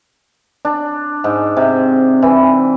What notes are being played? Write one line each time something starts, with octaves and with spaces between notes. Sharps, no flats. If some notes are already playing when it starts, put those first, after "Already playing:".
D4
G#2
C3
E3